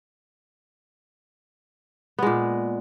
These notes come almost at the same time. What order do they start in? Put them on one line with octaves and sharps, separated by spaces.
B3 G#3 A#2